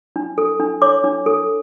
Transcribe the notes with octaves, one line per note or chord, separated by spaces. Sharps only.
D4
A4
D4
C#5 D6
D4
A4